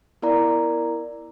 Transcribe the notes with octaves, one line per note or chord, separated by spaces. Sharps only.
B3 E4 A#4 D5 A#5